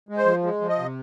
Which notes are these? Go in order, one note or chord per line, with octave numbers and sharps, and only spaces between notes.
G#3
C5
F3
G#3
F3
D#5
C3